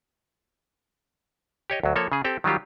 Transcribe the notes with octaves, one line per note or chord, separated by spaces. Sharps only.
G4 C#5 D#5
D2 F#3
F3 A#3 A4 C#5
C#3 G#4
C4 G4 A4 G5
D#3 F#3 G3 F4 G4